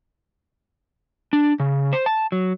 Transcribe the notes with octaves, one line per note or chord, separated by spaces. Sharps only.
D4
C#3
C5
A5
F#3